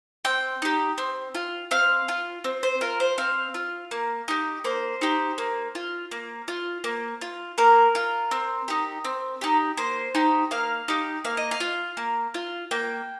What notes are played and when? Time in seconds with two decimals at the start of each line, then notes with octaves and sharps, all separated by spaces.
0.25 C4 G5
0.62 D#4 G4
0.98 C4
1.35 F4
1.71 C4 F5
2.08 F4
2.44 C4
2.63 C5
2.81 F4 A#4
3.00 C5
3.18 C4 F5
3.54 F4
3.91 A#3
4.28 D#4 G4
4.64 A#3 C5
5.01 D#4 G4
5.38 A#3
5.75 F4
6.11 A#3
6.48 F4
6.84 A#3
7.21 F4
7.58 A#3 A#4
7.95 F4
8.31 C4
8.68 D#4 G4
9.05 C4
9.41 D#4 G4
9.77 A#3 C5
10.15 D#4 G4
10.51 A#3 F5
10.88 D#4 G4
11.25 A#3 F5
11.37 D#5
11.51 F5
11.60 F4
11.97 A#3
12.34 F4
12.71 A#3 G5